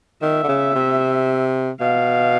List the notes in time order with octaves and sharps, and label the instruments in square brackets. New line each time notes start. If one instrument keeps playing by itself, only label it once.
[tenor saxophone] D#3 [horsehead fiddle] E5
[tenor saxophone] D3
C#3
C3
[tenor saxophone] B2 [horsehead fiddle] F5